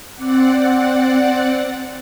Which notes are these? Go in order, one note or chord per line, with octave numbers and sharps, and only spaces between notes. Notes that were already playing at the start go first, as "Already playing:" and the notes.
C4 D5 F#5